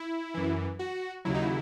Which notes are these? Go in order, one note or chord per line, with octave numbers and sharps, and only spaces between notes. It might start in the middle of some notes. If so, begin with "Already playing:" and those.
Already playing: E4
F#2 E3
F#4
D#2 C#3 F#3 E4
D#4
E4